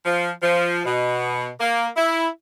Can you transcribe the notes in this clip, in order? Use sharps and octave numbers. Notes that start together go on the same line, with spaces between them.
F3
F3
B2
A#3
E4